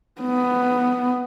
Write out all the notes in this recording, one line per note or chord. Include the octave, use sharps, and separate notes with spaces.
B3